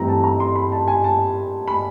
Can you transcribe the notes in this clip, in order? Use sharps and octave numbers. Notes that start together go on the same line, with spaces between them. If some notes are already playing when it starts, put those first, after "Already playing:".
Already playing: G2 E3 A3 C4 A#5
A5
A#5
C6
B5
A5
G#5
A5
B5